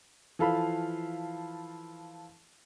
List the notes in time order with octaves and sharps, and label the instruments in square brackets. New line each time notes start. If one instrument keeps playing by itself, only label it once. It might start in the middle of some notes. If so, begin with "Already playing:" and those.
[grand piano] E3 F3 A4 F5 B5